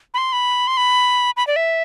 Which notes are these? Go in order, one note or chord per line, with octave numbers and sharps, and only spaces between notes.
B5
C6
B5
C6
B5
B5
D5
E5